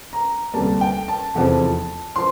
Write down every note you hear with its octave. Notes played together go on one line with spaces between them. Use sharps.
A#5
D2 C3 G3 A#3 A5
G5
A5
F1 E2 C3 F3
F3 C6